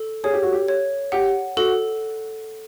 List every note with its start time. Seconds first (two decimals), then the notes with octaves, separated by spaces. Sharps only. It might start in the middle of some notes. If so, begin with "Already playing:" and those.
Already playing: A4
0.24 G#4 C#5
0.33 G4
0.43 F#4
0.52 G4
0.68 C#5
1.12 G4 F#5
1.57 F#4 A4